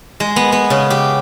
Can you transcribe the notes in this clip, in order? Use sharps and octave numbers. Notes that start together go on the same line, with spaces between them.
G#3
B3
B3
C#3
G4